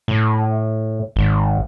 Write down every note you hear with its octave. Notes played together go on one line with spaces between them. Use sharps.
A2
G#1